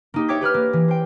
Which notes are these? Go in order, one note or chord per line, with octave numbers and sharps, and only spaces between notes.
A#3 D#4 G4
C#5 E5 G5 D6 G#6 B6
G4 B4 B5 F6
A#3
E3
C5 G5